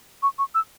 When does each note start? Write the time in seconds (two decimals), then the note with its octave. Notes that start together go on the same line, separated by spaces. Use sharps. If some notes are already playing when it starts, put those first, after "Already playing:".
0.22 C#6
0.38 C#6
0.54 E6